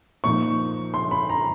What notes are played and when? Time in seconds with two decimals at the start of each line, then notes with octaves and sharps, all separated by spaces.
0.24 A#2 F3 A#3 D#4 C#6
0.94 C6
1.11 B5
1.29 A#5